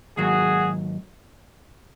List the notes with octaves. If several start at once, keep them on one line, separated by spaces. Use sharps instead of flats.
G#2 D#3 F#3 A#3 F#4 G#4